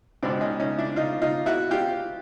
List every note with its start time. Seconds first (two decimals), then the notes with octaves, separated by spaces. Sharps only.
0.22 C#2 B2 C4 D4
0.41 C#4 D#4
0.60 C#4 D#4
0.78 D4 E4
0.96 D#4 F4
1.22 D#4 F4
1.46 E4 F#4
1.71 F4 G4